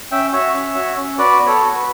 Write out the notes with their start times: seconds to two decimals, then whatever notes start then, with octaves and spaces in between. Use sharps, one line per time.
0.11 C#4 E5 G5
0.33 F#4 C#5 E5
0.54 C#4
0.75 F#4
0.96 C#4
1.18 F#4 B4 D5
1.40 B3
1.46 A4 C#5
1.60 F#4
1.76 B4